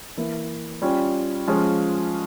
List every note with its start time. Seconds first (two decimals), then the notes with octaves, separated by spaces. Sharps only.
0.17 E3 A#3 E4
0.82 G3 C#4 F4
1.48 F3 G#3 C#4 F4